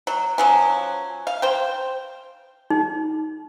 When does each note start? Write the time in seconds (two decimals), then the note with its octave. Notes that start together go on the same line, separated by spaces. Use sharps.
0.07 F#3
0.38 F3 F#3 C#4
1.27 F5
1.42 C5 G5
2.70 D#4